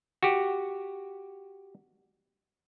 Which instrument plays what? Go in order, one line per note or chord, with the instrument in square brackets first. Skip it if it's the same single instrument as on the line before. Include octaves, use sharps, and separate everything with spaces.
[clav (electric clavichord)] F#4 G4